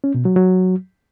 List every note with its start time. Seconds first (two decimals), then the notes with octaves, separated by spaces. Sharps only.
0.04 C#4
0.14 B2
0.25 F#3
0.36 F#3